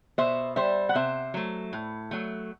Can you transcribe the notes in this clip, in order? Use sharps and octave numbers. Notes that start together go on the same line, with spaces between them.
B2 C5 E5
G3 C5 E5
F#5
C3 C5 E5
F#3 A3
A2
F#3 A3